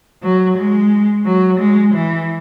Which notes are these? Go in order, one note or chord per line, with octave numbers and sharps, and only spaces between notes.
F#3
G#3
F#3
G#3
E3